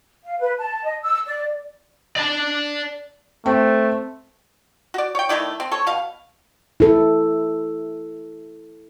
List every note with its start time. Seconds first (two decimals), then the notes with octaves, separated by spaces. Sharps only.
0.25 F5
0.40 B4
0.58 A5
0.84 D#5
1.02 E6
1.27 D5
2.16 D5 A5
3.46 A3 C4
4.94 F#4 D5
5.15 C#5 G5
5.29 D#3 A3 E4 D5
5.60 C4
5.71 A4 C#5
5.87 B2 F5
6.80 E4 A4